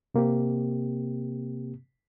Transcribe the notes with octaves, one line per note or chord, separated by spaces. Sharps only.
C3 A#3 C4 G4